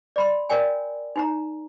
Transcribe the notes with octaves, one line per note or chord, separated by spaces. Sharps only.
D5 B5 C6
A#4 C#5 D5 G5 G#5
D#4 E4 A#5